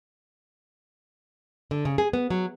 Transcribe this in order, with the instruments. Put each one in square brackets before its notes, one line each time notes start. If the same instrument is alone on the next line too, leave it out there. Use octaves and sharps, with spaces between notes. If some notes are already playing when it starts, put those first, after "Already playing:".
[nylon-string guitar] D3
C#3
G#4
B3
F#3